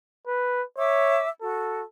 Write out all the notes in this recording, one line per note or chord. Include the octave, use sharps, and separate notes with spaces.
B4
C#5 E5 D6 E6
F#4 A4